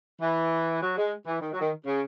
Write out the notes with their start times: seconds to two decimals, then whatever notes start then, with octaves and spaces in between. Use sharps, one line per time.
0.21 E3
0.81 F#3
0.96 G#3
1.27 E3
1.41 D#3
1.52 F#3
1.61 D#3
1.86 C#3